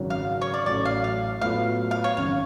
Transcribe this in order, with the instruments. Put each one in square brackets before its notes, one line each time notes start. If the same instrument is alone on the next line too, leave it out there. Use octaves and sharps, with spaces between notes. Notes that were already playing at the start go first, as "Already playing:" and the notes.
Already playing: [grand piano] G#1 F#2 C#3 F#3
[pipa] F5
C#5
D5
[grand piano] A1 A2 F#3 [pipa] D5
[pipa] F5
F5
[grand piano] A2 F#3 B3 F4 [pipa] F5
[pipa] F5
C#5
[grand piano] G#1 F#2 C#3 [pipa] F5